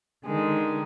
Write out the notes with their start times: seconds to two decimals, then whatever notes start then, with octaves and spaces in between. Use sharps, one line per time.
0.25 D3 D#3 G#3